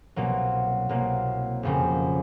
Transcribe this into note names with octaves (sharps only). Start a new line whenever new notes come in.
C2 B2 F#3 A#3
C2 B2 F#3 A#3
F#1 F2 C#3